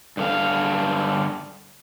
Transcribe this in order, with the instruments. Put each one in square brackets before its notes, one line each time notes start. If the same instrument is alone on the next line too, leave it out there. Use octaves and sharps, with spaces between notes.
[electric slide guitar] G2 D3 F5